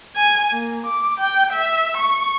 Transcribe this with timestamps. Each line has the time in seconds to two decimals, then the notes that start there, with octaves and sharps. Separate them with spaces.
0.16 G#5
0.52 A#3
0.86 D6
1.20 G5
1.53 E5
1.98 C#6